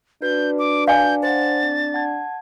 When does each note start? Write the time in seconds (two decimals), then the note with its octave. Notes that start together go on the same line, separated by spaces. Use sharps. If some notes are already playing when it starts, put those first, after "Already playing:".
0.22 D4 F#4 B4 G6
0.59 D6
0.88 F5 G#5 G6
1.23 C5 F#5 A6
1.63 C4
1.94 F#5 A5 G#6